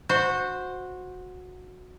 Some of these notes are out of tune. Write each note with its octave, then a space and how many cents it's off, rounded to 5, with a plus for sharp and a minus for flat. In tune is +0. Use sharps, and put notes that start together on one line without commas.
F#4 -15 C5 +0